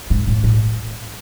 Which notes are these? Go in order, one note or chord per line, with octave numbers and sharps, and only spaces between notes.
G#2
A2
A2